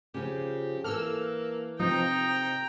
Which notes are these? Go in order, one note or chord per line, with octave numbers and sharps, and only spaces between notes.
C#3 F3 G4
E3 A#3 A4 E6 F6
C3 F3 D#4 G5 A#5